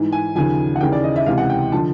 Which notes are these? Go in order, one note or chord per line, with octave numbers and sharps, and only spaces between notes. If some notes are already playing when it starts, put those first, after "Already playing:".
Already playing: G#2 E3
G#5
D#2 C#3 F3 G#5
F#5
D#2 C#3 E3 G5
D5
D#5
E5
C#2 C3 E3 F5
F#5
G5
D3 F3 A5